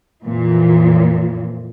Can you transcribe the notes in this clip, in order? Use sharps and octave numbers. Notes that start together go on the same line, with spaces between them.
F2 A#2 E3